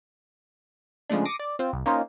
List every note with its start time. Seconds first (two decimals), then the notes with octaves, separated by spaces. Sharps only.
1.10 C#3 F3 G#3 A3 D4
1.25 D6 D#6 A#6 C7 C#7
1.39 D5
1.59 C4 F4 C5
1.73 C2
1.86 A#3 C#4 D#4 F4 C5